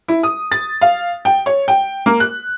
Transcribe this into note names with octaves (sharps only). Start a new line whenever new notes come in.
E4
D#6
A6
F5
G5
C#5
G5
A#3
F#6